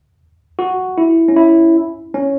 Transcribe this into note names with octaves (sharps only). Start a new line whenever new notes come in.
F#4
E4
C#4
E4
C#4